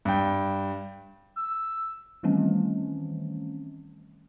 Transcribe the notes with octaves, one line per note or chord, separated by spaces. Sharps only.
G2 G5
E6
D#3 E3 G3 A3 C4 C#4